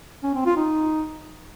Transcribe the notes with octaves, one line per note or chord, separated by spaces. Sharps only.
C#4
C4
F4
D#4